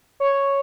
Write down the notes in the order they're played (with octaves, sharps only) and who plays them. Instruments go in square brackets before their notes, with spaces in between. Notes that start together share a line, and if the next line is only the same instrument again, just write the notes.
[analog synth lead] C#5